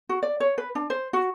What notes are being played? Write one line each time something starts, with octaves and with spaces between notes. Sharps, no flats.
F#4
D5
C#5
B4
D4
C5
F#4